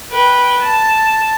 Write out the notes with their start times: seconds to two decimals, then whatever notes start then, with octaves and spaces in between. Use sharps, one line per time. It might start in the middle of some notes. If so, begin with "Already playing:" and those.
0.11 B4 G5
0.62 A5